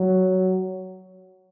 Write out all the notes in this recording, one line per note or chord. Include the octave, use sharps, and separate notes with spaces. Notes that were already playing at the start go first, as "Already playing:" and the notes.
Already playing: F#3